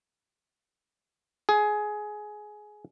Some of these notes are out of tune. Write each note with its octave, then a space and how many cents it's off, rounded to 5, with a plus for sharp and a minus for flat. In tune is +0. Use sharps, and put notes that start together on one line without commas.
G#4 +15